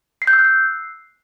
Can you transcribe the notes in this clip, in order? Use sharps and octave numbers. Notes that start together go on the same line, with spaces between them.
C7
G6
E6
F#6
C7